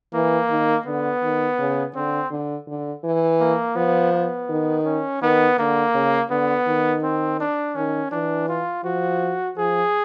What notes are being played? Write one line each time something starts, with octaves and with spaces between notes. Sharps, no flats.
E3 A#3
D#3
D3 B3
D#3
C#3
D3 C4
D3
D3
E3
A#3
F3 B3
B3
D#3
C#4
D#3 B3
D3 A#3
C#3
D3 B3
D#3
C4
D4
D#3 C#4
E3 D4
F4
F3 F#4
F3 G#4